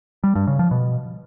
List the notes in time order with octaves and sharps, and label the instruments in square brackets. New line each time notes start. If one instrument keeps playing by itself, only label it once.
[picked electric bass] G3
G2
C#3
F3
B2